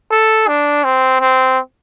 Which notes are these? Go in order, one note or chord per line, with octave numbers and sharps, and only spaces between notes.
A4
D4
C4
C4